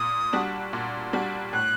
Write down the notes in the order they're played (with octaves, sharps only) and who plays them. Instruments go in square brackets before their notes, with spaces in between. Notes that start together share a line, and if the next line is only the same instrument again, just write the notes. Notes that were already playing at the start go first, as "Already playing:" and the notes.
Already playing: [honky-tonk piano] A#2 [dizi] D#6
[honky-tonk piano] G3 D4 F#4
A#2
G3 D4 F#4
[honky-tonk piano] A2 [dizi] F#6